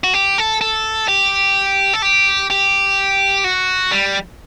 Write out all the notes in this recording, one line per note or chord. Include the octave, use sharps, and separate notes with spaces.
F#4
G4
A4
A4
G4
A4
G4
G4
F#4
G3